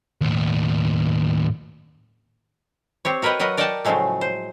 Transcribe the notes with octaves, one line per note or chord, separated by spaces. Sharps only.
D#2 A2
C4 G4 C#5
F#4 A#4 B4 C#5 D#5 G5
F#3 F#4 A#4 B4 D#5
A#4 D5 D#5 F#5 G5 A5
A2 C#3 F3 F#3 G#3 A3
C5